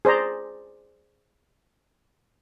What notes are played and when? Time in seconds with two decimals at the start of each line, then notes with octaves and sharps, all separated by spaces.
0.05 G#4 C5 D5 A#5